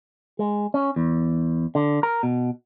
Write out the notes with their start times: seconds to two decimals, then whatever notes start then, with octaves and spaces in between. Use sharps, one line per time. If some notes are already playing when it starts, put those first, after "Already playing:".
0.39 G#3
0.74 C#4
0.96 E2
1.75 D3
2.03 A#4
2.23 B2